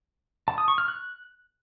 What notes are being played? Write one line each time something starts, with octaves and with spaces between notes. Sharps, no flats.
A5
D#6
C#6
F6
F#6